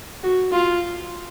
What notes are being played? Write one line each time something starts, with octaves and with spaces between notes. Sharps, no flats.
F#4
F4